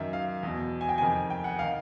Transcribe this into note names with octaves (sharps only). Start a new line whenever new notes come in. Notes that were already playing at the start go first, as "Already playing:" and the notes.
Already playing: F#2 D#3 E5
F5
E2 B2
G#5
G5
F2 C3 D#3 G#5
G5
F#5
D#3 F5